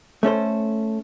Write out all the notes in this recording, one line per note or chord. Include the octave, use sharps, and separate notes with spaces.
A3 C#4 A4 C5